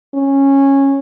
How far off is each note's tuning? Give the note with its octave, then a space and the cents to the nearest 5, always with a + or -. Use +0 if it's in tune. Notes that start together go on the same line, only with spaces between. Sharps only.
C#4 -10